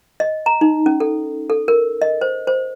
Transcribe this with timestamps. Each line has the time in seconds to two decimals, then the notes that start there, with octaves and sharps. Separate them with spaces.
0.20 D#5
0.46 A#5
0.61 D#4
0.86 C#4
1.00 A4
1.50 A4
1.68 A#4
2.02 D#5
2.21 C5
2.47 C5